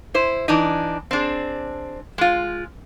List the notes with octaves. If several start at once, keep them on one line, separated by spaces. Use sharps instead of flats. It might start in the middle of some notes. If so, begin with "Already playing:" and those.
E4 C5
E3 D4 D#4
C4 D4 G#4
G#3 F4